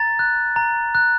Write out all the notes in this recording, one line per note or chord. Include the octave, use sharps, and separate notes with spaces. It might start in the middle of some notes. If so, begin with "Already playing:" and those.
Already playing: A#5 A6
F#6
A#5
F#6